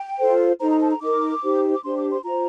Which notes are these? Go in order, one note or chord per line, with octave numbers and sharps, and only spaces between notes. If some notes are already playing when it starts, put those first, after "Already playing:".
Already playing: G5
F4 A4 C5
D#4 A4 C5 A#5
A#5
A5
A#5
D#4 A#4 D6
D#4 G4 C5
D6
D4 G4 C5 C6
D6
C6
F4 C5 A#5